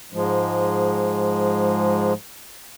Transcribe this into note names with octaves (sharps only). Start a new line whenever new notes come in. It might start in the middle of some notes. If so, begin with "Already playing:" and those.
G#2 F3 G#3